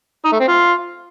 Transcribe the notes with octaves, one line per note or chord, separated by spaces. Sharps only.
D#4
A3
C4
F4